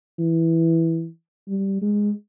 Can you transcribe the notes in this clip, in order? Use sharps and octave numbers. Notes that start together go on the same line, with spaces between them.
E3
G3
G#3